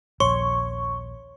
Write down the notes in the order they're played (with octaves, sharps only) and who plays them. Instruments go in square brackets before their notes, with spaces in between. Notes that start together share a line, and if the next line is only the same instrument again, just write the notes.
[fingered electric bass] D#1 A#1 [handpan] C#5 [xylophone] C6 [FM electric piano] C#6